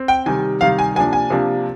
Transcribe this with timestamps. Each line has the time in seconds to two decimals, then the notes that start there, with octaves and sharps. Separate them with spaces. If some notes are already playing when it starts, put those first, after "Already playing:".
Already playing: C4
0.08 G5
0.26 C3 D#3 G3 G#5
0.61 C3 D#3 G3 F5
0.79 G#5
0.95 C3 F3 A#3 D4 G#5
1.13 G#5
1.30 C3 F3 A#3 D4